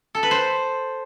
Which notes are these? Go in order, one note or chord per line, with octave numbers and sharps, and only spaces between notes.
A4
B4
C5